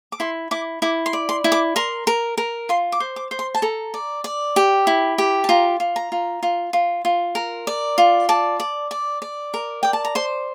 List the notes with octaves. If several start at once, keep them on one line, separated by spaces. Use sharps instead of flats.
D6
E4 C6
E4 D6
E4 D6
C6
D5
C6
E4
D6
A#4 C6
A#4
A#4
F4 C6
D6
C5
D6
C5
C6
A5
A4 A#5
D5
D5
G4
E4
G4
A5
F4 A#5
F4
A#5
F4
F4
F4
F4
A#4
D5
F4
D5 A5
D5
D5
D5
A#4
D5 G5
A5
A#5
C5 C6